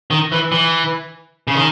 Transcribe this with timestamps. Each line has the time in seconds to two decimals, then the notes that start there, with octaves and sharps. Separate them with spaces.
0.11 D#3
0.32 E3
0.52 E3
1.48 C#3
1.55 D#3